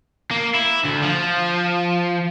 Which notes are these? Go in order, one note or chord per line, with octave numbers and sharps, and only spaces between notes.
A#3
E4
D2
F3